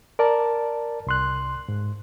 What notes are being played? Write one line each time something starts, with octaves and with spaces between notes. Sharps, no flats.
A#4 D5 A5
C2 C6 F#6
G#2